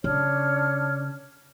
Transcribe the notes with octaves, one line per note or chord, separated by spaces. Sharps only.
C#3 D4 C#5 F6